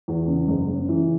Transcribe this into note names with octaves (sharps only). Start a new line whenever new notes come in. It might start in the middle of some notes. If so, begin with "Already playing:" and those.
E2
C#3
F#1
C#3
E3